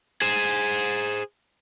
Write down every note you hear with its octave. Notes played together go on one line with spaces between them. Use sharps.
G#4 C5